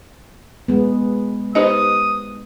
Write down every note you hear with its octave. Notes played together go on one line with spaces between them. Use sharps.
G#3 B3
D#4 G4 B4 C5 D#5 D#6